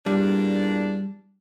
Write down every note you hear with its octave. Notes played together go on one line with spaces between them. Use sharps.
E2 A#2 G3 D4